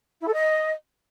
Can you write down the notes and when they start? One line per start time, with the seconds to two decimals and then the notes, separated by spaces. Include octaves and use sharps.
0.21 E4
0.27 A4
0.33 D#5